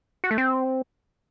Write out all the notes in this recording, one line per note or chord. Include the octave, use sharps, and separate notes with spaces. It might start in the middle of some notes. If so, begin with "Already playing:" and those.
F#4
A3
C4